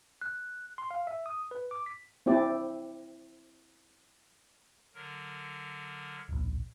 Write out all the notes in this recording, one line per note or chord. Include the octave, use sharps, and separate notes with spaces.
F#6
C6
F5
E5
D#6
B4
D6
B6
C4 E4 G4 D5
D3 F#3 A#4
D1 A#1